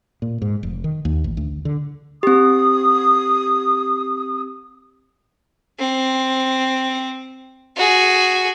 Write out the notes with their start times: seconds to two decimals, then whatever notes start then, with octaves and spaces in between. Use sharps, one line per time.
0.22 A#2
0.42 G#2
0.63 F1
0.84 D#3
1.05 D#2
1.24 A1
1.37 D2
1.65 D3
2.23 C4 G4 D#6
5.79 C4
7.76 F#4 G#4